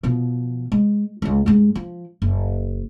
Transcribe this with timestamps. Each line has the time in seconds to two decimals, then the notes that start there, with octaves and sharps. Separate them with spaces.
0.03 B2 F3
0.72 G#3
1.22 C#2 G#3
1.46 G2 G#3
1.75 F3
2.22 F#1